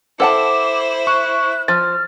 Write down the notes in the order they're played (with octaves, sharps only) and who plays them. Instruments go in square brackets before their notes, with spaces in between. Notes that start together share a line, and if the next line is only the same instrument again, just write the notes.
[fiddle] E4 C5 [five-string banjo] A4 F#5 A5 [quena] D6
[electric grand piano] C#6 [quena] F#6
[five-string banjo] F3 [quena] F6 [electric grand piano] A6